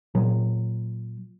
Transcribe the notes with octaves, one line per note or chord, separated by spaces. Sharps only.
A#2 F#3